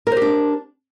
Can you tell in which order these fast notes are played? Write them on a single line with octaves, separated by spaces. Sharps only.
A#4 C5 G4 D4